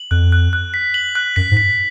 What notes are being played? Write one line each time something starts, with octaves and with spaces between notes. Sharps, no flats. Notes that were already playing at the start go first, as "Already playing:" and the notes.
Already playing: F#7
F2 F#6
F#6
F#6
B6
F#7
F#6
F#2 B6
G#2
B6